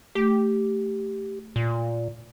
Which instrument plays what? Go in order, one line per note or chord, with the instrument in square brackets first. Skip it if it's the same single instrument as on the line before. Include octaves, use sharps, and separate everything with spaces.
[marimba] A3 [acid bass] G4
[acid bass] A#2